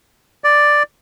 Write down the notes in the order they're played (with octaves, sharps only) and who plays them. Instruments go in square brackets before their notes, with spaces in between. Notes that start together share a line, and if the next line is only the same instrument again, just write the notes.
[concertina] D5